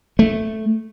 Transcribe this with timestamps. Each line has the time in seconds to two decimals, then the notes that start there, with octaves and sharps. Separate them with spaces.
0.19 A3